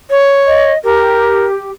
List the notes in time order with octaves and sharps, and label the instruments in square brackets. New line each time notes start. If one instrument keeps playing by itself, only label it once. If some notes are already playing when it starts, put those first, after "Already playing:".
[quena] C#5
[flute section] D#5
[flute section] G4 [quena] A#4